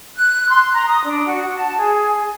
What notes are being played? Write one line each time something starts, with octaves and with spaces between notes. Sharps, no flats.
F#6
C6
A#5
D#6
D4
F#4
A5
G#4